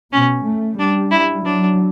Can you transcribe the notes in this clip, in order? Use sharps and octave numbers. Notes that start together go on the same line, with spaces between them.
B2 C#4
A3
G3 D4
E4
F#3 D4